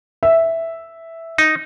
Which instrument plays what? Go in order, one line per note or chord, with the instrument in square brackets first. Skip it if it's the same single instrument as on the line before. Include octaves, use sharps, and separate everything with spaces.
[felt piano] E5
[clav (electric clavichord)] D#4